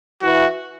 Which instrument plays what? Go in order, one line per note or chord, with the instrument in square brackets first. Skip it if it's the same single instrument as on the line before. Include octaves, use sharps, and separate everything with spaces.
[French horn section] E3 [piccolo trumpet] F#4